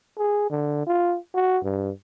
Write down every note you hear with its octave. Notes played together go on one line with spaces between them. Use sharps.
G#4
D3
F4
F#4
G2